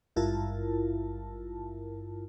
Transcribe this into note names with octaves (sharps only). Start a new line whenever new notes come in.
G#1 G2 E4 F4 A#4 A5